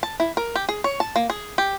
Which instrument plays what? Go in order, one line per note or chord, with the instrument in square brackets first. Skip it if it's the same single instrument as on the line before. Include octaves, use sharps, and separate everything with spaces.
[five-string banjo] A5
E4
A#4
G4
G#4
C#5
A5
A#3
G#4
G4